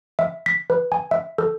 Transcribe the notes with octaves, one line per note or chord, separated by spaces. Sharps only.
E5
B6
B4
G#5
E5
A4